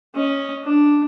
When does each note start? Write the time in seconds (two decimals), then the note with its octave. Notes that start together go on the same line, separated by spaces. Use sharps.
0.15 C#4 D#5
0.64 D4